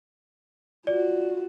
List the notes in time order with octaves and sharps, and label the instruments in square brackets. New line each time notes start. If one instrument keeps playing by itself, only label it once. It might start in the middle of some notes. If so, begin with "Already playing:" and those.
[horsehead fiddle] F4 F#4 [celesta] D5